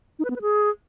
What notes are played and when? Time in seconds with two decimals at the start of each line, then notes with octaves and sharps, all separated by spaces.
0.19 D#4
0.25 B4
0.30 B3
0.36 B4
0.41 G#4